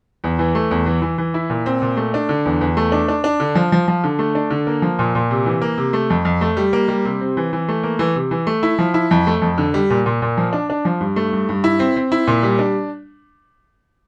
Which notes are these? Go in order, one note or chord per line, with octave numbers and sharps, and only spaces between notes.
E2
E3
A3
E2
E3
E3
E3
E4
A#2
C4
A#2
A3
D4
D3
E2
E2
A3
D4
D4
D4
D3
F3
F3
F3
D3
A3
D4
D3
A#3
F3
A#2
A#2
C3
E3
A#3
C3
A3
F2
F2
A3
G3
A#3
G3
C3
C4
E3
E3
A3
A#3
E3
C3
E3
A3
E4
F3
E4
F2
A3
F2
D3
G3
A#2
A#2
A#2
F3
D4
D4
F3
G2
A3
G2
G2
E4
C4
C4
E4
A#2
G3
D4